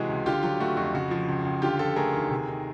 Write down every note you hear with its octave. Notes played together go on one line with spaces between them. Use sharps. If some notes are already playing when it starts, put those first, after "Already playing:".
Already playing: C3 E3 G#3 F#4 G#4
C#2
D3 F4 G4
F#3 F4
A3 F#4
F2 F#4
C#3 F#4
F3
C#2
C#2
D3 F4 G4
F3 G4 A4
A3 G#4 A#4
D#2
C3
D#3